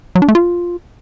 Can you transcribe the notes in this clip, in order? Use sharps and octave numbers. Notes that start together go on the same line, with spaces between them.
F#3
D4
A3
F4